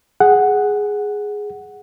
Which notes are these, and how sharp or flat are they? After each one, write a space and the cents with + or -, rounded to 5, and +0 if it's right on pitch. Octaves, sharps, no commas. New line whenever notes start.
G#4 +0 F#5 +0